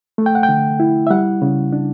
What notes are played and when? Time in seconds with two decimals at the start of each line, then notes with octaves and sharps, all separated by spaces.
0.18 A3
0.26 G5
0.35 F#5
0.43 G5
0.49 D3
0.80 E4
1.07 E5
1.10 G3 F#5
1.42 C#3
1.73 D4